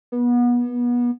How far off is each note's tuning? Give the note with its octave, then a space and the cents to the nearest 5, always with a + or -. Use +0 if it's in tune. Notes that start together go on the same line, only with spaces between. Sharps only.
B3 -30